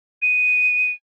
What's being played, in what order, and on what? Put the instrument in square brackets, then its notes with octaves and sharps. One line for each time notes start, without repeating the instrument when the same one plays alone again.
[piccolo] D#7